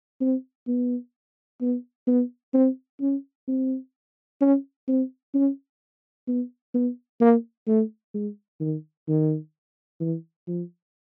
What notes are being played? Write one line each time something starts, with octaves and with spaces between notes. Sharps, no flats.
C4
B3
B3
B3
C4
C#4
C4
C#4
C4
C#4
B3
B3
A#3
A3
G#3
D#3
D#3
E3
F3